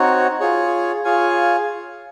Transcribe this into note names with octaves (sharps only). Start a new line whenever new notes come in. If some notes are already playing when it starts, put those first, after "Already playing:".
Already playing: C4 D#4 F#4 C#5
F4 G#4 C#5
F4 G#4 C#5 F5 G#5